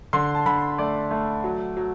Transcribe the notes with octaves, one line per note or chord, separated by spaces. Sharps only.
D3 C6
A5
D3 B5
A3 D5
A3
F#3
F#3